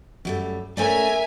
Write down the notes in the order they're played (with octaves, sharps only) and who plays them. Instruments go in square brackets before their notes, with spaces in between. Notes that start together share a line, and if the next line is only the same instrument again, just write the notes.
[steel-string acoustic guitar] F#2 G3 A3
[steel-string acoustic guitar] A3 C#4 D5 [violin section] A#4 E5 G#5